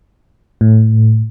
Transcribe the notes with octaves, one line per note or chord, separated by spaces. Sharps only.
A2